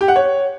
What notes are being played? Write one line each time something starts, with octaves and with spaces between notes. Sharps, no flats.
G4
F#5
C#5